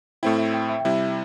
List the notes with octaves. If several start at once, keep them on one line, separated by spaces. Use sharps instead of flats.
A2 A3 C4 E4 G5
E5
G5
E5
G5
C3 G3 E4 E5